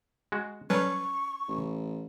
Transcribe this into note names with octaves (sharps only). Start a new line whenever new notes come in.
G#3 F#4
F#3 G3 C#4 A4 B4 C#5 C#6
A1